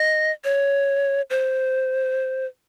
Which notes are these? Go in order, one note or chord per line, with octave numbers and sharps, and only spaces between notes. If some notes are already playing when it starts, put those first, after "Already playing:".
Already playing: D#5
C#5
C5